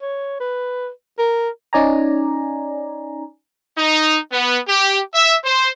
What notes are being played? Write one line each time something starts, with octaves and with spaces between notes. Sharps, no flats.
C#5
B4
A#4
C#4 D#4 D5 G#5 A#5
D#4
B3
G4
E5
C5